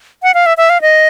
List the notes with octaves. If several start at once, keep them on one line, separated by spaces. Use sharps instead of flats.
F#5
F5
E5
E5
F5
D#5